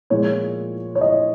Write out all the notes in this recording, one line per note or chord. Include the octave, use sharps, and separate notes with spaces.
A#2 F3 G#3 C#5
C#5
D#5